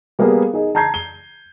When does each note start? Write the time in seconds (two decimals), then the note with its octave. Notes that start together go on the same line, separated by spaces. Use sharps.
0.19 G3 A#3 B3 G#4 B4 F5
0.54 D#4 G#4
0.75 A5 A#5 G6 G#6 C7
0.94 G7